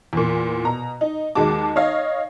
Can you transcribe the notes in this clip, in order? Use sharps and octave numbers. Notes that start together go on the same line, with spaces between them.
E2 A#2
B2 A#5
D#4
D#2 G#3 F#4 A5 D6
D#4 C#5 D#5 F5